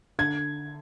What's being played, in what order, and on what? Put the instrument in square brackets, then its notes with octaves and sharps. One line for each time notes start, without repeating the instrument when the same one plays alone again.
[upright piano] D3 G#6